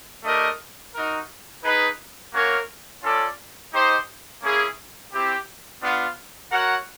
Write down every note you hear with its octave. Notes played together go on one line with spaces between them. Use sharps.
A3 D4 G4 A#4 D#5
D#4 F#4 A#4
D#4 G#4 B4
A#3 C#4 F#4 A#4 C#5
C#4 F4 A4 D5
D#4 G4 C5 D#5
A#3 C#4 E4 G#4
C4 E4 G4
B3 D4 F4
F#4 A#4 C#5 F#5